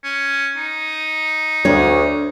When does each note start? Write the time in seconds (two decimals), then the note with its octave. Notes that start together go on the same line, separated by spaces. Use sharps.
0.04 C#4
0.57 D#4
1.65 D2 D4 C#5